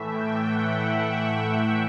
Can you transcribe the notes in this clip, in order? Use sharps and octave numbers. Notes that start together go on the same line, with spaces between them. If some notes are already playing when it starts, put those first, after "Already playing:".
Already playing: A2 E3 A3 E5
G5
F#5
E5
E5